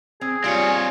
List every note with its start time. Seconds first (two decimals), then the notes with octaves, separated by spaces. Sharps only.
0.21 C4 G#4
0.44 G3 C4 F4 C#5 G#5